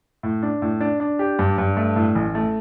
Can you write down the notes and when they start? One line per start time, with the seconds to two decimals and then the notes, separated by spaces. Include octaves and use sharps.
0.23 A2
0.43 D4
0.62 A2
0.81 D4
1.00 D4
1.19 G4
1.39 G2
1.58 G2
1.77 A3
1.96 A2
2.15 A1
2.35 A3